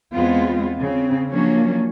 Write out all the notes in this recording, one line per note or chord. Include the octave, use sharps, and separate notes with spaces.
E2 G#3 B3 C4 F4
C#3 C4
F3 F#3 A#3 C#4 D4